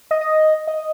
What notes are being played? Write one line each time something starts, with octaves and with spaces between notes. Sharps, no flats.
D#5
D#5
D#5